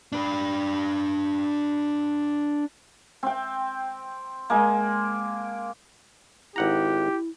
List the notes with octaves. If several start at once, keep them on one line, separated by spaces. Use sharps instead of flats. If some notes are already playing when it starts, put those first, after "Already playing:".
D4 B4
C4 G5
G#3 A#3
G#1 E4 G4 F#5 A#5